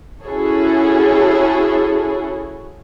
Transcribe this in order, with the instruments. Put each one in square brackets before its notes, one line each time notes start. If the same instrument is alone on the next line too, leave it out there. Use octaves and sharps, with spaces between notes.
[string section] C#4 E4 F#4 G#4 A4 C#5